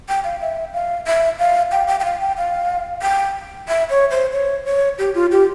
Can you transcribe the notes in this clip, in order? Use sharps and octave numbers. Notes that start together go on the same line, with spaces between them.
G5
F5
E5
F5
E5
F5
G5
G5
G5
F5
G5
F5
G5
E5
C#5
C5
C#5
C#5
G4
F4
G4